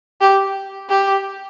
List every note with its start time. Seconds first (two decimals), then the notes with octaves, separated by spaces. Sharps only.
0.21 G4
0.89 G4